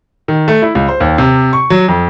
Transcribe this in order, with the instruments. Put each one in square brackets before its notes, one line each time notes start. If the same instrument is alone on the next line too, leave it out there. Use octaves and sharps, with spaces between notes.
[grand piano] D#3
A3
E4
C#2
C5
D#2
C3
C#6
F#3
F2